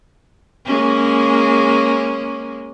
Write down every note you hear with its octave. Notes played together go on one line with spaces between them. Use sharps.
G#3 A#3 C#4